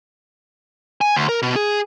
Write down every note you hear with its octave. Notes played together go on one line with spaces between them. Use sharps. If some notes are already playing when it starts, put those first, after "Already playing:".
G#5
D2
A#4
B2
G#4